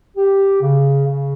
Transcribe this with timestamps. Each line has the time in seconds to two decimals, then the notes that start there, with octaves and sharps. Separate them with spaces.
0.17 G4
0.61 C#3
1.07 C#3